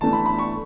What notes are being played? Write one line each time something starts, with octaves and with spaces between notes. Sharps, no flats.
E3 A3 D4 A5
B5
B5
C#6